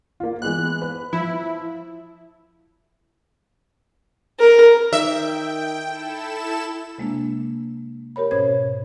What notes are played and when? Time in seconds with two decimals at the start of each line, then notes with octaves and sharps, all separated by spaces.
0.20 A#3 F4
0.42 E3 G#3 B3 F#6
0.82 B4
1.13 F3 E4
4.39 A#4
4.93 D#3 E5 G5
5.83 E4 A4 E7
6.98 C3 G#3 A#3 D4
8.16 G4 A#4 C#5 B5
8.31 G#2 B2 C#4 C5 C#5 G#6